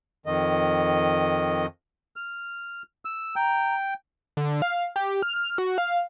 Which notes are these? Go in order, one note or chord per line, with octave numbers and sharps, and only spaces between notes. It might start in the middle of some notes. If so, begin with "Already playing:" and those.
F2 D#3 D#5
F6
E6
G5 A#5
D3
F5
G4
F6
F6
F#4
F5